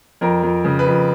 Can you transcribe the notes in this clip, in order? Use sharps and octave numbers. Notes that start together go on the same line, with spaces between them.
F2 A#4
F2
C#3
B4
F2